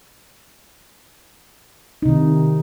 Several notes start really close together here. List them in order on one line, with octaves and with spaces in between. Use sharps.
D#4 C3 D#3